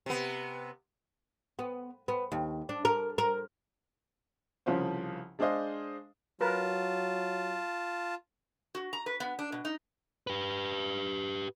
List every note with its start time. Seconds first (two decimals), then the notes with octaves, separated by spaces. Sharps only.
0.06 C3 B3
1.59 B3
2.08 B3
2.32 D#2
2.69 D4
2.85 A#4
3.18 A#4
4.66 C2 C#3 F3 F4 C5
5.39 G#3 D4 G#4 C5 D#5 F5
6.41 F#3 F4 A#4 B4 A5
8.75 F#4
8.93 A#5
9.06 B4
9.20 B3
9.39 D4
9.52 B2
9.65 D#4
10.27 G4 B4